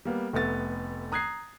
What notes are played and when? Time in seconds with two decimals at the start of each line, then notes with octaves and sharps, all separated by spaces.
0.05 G3 A#3 B3
0.33 F1 A3 B3 A6
1.12 A#5 D#6 F#6 G#6 A#6 C7